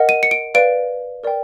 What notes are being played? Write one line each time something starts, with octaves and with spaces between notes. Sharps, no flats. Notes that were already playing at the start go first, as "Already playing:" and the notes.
Already playing: A#4 D#5 F#5
D#7
C#7
D7
B4 D5 F5 D7
A#4 D5 G5